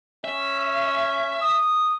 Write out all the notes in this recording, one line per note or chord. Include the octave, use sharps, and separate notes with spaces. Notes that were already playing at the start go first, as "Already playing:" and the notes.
C#4 E5
D#6